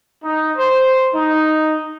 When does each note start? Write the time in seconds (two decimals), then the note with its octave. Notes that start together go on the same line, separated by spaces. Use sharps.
0.23 D#4
0.57 C5
1.14 D#4